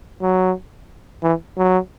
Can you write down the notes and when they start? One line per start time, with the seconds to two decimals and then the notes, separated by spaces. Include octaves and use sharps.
0.21 F#3
1.23 E3
1.57 F#3